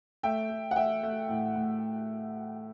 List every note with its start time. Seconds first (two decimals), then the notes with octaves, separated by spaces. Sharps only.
0.23 A3 E5 G5
0.50 A3
0.71 F#5
0.76 A3 E5 G5
1.03 A3
1.29 A2
1.56 A2